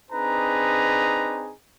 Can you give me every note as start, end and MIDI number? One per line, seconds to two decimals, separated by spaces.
0.10 1.52 60
0.10 1.52 62
0.10 1.52 63
0.10 1.52 68
0.10 1.52 71
0.10 1.52 82